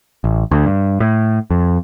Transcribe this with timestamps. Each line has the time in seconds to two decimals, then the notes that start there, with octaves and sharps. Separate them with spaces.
0.24 A1
0.51 D2
0.66 G2
1.00 A2
1.51 F2